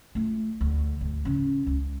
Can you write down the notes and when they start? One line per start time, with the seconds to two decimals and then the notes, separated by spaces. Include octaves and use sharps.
0.15 A3 F4
0.61 D2
1.01 D2
1.25 C#3 C#4
1.67 C#2